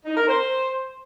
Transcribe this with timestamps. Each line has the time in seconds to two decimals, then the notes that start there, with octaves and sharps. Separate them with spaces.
0.05 D#4
0.17 A#4
0.29 C5